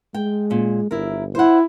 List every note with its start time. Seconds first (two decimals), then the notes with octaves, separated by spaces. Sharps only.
0.14 G#3 G5
0.50 A#2 C#4
0.91 G1 E4 A#4
1.35 E4 C5 F#5